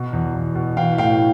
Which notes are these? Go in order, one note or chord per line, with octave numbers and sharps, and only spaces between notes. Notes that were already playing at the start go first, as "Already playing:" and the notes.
Already playing: B2
E2
E2
B2
E3 F5 G5
A2 F5 G5